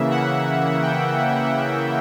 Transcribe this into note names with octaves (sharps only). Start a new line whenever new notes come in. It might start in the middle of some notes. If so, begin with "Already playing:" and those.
Already playing: C#3 E3 A#3 E5
F#5
G5
F#5